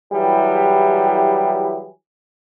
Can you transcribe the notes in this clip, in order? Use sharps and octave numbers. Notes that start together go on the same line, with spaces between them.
E3 F#3 G3 E4 G4 G#4